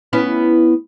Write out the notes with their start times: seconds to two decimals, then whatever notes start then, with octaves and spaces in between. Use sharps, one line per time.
0.13 B3 C#4 E4